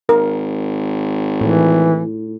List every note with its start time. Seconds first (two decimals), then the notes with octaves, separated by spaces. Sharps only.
0.09 G#1 A#4
1.41 A2 E3